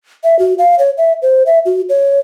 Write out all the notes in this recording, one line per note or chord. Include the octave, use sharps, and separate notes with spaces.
E5
F#4
F5
C#5
E5
C5
E5
F#4
C#5